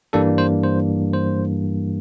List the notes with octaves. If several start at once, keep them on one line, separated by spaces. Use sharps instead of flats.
G2 E3 G3 A#3 D4 A4
C5
C5
C5